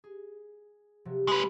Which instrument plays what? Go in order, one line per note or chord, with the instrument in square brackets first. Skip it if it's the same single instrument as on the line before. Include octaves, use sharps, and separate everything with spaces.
[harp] G#4
C3 F3 F#3
[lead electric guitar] G#3 B4